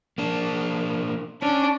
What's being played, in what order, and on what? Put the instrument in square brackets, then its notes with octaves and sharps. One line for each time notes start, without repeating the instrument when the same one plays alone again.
[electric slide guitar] A#3 D4
[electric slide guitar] C#4 [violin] D4